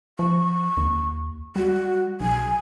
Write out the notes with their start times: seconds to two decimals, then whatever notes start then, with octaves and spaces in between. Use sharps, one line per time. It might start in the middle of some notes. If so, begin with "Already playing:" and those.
0.19 F3 C#6
0.77 D#2
1.56 G3 F#4
2.20 B1 G#5